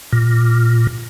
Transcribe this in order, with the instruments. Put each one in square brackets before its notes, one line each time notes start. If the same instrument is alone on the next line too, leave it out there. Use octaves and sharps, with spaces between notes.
[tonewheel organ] A#2